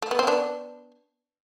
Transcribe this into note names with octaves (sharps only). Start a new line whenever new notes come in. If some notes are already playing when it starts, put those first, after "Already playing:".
A3
B3
C4
B3 D4